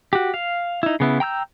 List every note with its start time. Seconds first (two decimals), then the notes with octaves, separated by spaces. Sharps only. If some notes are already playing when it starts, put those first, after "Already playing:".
0.13 F#4 G4
0.34 F5
0.83 D#4 E4
1.00 C#3 B3 E4
1.20 G5 A#5 E6 G6